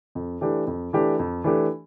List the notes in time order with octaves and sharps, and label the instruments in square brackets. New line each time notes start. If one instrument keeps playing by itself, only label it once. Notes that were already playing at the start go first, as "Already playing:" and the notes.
[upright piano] F2
E3 A3 D4 G4
F2
E3 A3 D4 G4
F2
E3 A3 D4 G4